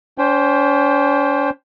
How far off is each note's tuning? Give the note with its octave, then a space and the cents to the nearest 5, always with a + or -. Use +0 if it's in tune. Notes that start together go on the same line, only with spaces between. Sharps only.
C#4 +45 C5 +10 G5 +20